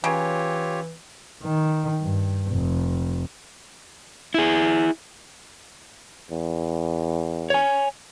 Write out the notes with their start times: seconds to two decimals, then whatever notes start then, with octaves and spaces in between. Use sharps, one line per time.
0.04 C#3 E3 F4 G4 C#5
1.44 D#3
2.01 G2
2.52 F1
4.34 E4 G#4
6.31 E2
7.50 C#5 G#5